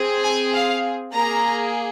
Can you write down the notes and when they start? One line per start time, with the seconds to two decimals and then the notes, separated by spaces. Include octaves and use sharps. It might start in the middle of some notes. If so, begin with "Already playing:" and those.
Already playing: C4 G#4
0.25 G#5
0.54 F5
1.14 A#3 G#4 A#5